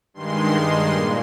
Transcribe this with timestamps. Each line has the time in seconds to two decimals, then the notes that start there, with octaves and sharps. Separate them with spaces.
0.14 G2 D#3 G#3 C6
0.92 A#2